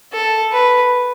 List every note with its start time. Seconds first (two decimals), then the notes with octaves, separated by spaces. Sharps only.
0.13 A4
0.52 B4